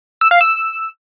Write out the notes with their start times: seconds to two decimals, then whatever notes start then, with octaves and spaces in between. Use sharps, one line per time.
0.21 E6
0.31 F5
0.41 E6